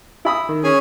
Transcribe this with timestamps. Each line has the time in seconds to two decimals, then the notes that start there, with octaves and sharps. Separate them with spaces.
0.25 E4 B5 D#6
0.49 D#3
0.64 C#4 G#4 G#5